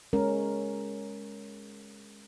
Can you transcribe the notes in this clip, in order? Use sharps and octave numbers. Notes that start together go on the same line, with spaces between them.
G#3 C#4 A#4